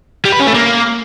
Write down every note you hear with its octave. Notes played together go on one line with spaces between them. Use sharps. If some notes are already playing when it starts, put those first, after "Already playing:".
G3
B4
C#4
A3
A#3